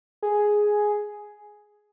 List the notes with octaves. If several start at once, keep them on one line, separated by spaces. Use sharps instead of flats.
G#4